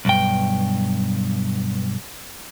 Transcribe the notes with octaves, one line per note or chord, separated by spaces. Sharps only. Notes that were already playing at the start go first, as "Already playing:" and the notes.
B1 G2 G5